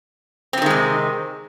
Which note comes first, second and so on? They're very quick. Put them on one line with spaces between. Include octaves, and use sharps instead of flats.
C4 F3 D#3 G#3 C3